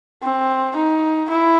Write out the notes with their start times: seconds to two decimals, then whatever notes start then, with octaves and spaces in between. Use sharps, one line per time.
0.23 C4
0.76 D#4
1.30 E4